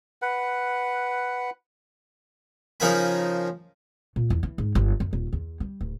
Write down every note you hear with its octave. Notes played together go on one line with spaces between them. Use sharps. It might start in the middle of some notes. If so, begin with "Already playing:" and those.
B4 F#5
C#3 F3 D#4 A#4 G#5 B5
A#2
E2
E3
G#2
G1
F#2
D#1
E2
G3
D1